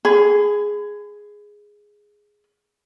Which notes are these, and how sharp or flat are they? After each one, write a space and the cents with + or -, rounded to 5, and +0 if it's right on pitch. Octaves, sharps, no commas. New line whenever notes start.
G#4 +0 B5 +35